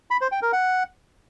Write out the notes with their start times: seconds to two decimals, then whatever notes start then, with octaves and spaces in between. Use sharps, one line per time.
0.11 B5
0.21 C5
0.32 G5
0.42 A#4
0.53 F#5